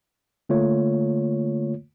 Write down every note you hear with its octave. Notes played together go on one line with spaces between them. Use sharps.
D3 A3 A#3 F4 C#5